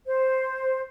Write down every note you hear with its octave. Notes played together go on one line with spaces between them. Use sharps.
C5